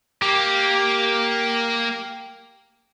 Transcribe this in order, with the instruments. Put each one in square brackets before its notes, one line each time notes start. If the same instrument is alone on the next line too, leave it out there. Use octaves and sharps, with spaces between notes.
[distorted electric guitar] A#3 [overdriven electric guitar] G4